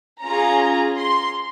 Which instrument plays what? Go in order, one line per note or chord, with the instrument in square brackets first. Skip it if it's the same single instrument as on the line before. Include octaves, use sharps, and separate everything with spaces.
[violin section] C#4 F4 G#4 A#5
C6